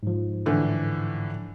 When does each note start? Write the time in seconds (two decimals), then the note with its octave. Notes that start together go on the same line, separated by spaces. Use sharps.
0.03 G#2 F3
0.46 A2 D3 E3